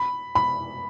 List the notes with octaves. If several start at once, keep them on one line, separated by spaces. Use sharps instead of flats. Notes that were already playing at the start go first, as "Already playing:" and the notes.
Already playing: B5
B5